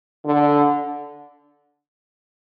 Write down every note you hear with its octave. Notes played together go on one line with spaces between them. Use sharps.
D3